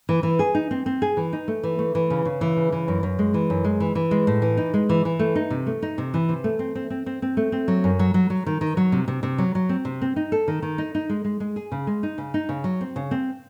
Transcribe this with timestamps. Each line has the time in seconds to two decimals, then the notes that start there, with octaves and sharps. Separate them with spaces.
0.09 E3
0.23 E3
0.39 G#4
0.55 D#4
0.71 C4
0.86 C4
1.02 G#4
1.17 E3
1.33 D#4
1.48 A3
1.63 E3
1.79 A3
1.95 E3
2.10 C#3
2.25 C#3
2.41 E3
2.57 C#3
2.72 E3
2.88 F#2
3.03 F#2
3.19 G#3
3.34 E3
3.50 F#2
3.64 G#3
3.80 E3
3.95 E3
4.11 G#3
4.27 A2
4.42 E3
4.57 D#4
4.74 G#3
4.89 E3
5.05 E3
5.19 A3
5.35 D#4
5.50 C3
5.67 A3
5.82 D#4
5.98 C3
6.14 E3
6.29 C3
6.44 A3
6.59 C4
6.75 C4
6.90 C4
7.06 C4
7.22 C4
7.37 A3
7.52 C4
7.68 F#3
7.84 F#2
7.99 F#3
8.14 F#3
8.30 F#3
8.46 D#3
8.61 D#3
8.77 F#3
8.92 C3
9.08 C3
9.23 C3
9.38 F#3
9.55 F#3
9.69 C4
9.85 C3
10.02 C4
10.16 D#4
10.32 A4
10.48 D#3
10.62 D#3
10.78 D#4
10.95 D#4
11.09 G#3
11.25 G#3
11.40 G#3
11.56 G#4
11.72 C#3
11.87 G#3
12.03 D#4
12.18 C#3
12.34 D#4
12.49 C#3
12.64 F#3
12.81 C4
12.96 C#3
13.11 C4